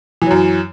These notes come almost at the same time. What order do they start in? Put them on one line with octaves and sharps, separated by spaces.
E3 F#3 F#2